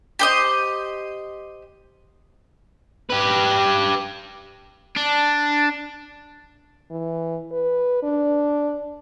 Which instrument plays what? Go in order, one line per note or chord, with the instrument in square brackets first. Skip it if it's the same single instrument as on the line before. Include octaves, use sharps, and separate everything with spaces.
[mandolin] G4 C5 D#5
[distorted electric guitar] G4 B4
[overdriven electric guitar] D4
[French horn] E3
B4
D4